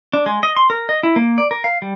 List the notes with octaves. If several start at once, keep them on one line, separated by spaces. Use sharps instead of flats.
D4
G#3
D#5
C6
A#4
D#5
E4
A#3
D5
A#4
F5
G3